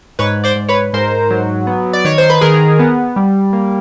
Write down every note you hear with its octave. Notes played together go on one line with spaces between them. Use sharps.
G#2 B4 C#5
C5 D5
G#2
B4 C#5
G#2 A#4 C5
F#3
B3
D5
D#3 C#5
C5
B4
D#3 G#4 A#4
B3
G3
A#3